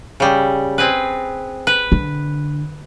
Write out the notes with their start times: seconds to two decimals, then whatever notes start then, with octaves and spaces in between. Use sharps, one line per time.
0.20 C#3 G3
0.78 C4 G#4 B4
1.67 B4
1.92 D3